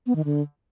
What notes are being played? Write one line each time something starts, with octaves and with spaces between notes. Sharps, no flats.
B3
D#3
D3